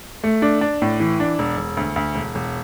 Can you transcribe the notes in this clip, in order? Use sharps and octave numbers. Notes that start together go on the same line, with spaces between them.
A3
D4
D4
A2
E3
D4
E1
E1
D2
D2
E1
E1